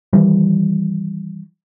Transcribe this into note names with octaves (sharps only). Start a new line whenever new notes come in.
D#3 E3 G3